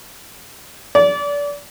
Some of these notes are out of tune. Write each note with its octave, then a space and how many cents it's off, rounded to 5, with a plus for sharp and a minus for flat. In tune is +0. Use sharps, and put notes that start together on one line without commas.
D5 -30